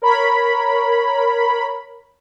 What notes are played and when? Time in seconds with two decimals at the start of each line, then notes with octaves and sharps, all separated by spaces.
0.02 A#4 C#5 B5